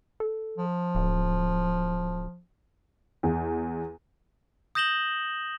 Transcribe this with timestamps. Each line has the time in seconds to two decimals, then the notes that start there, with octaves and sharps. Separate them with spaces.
0.20 A4
0.58 F3
0.95 D1
3.23 E2
4.75 D#6 G6 A#6 E7 F#7 G7